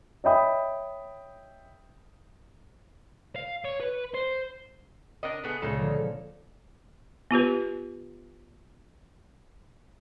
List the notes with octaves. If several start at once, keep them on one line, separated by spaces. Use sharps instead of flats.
C#5 D#5 E5 G5 B5 D#6
F5
C#5
B4
C5
D4 A#4 D#5
A3 B3 G#4
C#2 A#2 C#3 D#4 A4
D3 F3 A#3
B3 F4 G4 B4